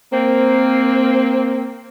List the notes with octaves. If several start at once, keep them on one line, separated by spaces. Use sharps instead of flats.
A#3 C4